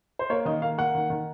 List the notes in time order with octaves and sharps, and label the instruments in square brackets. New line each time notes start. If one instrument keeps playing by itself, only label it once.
[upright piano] C5
A#3 C#5
D#3 D#5
A#3 F5
A#3 F#5
D#3
D#3